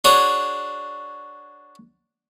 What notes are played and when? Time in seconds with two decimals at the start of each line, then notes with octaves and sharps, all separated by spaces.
0.04 D4 F#4 G#4 C#5 G#5